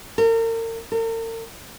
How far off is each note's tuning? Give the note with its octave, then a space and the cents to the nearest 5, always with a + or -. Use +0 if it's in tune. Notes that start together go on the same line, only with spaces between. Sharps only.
A#4 -40
A#4 -45